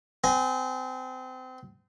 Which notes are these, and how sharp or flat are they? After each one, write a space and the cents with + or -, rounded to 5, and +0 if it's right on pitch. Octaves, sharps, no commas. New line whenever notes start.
C4 -30 G#5 +0